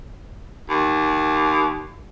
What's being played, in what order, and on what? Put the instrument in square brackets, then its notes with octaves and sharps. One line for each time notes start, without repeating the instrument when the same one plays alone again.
[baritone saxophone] D#2